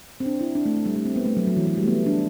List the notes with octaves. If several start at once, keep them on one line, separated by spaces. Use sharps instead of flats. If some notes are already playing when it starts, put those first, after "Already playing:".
C4
D4
E4
D4
A3
A3
G3
A3
C4
B3
A3
F#3
F#3
E3
F#3
G3
A3
B3
D4